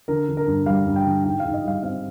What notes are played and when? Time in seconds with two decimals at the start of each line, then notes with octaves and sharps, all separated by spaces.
0.08 D3 A#4
0.28 D3
0.37 A#4
0.47 G2
0.66 G3 F5
0.86 G2
0.96 G5
1.06 D3
1.24 G#2 G5
1.40 G#2 F5
1.54 D#5
1.64 G3 F5
1.83 C4 F5